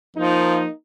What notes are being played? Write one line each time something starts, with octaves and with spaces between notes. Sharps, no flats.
F3 A#3 D#4